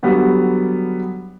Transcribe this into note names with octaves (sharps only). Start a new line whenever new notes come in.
D3 F#3 G3 B3